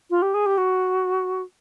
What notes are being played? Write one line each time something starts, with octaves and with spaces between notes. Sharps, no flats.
F4
G4
G#4
G4
F#4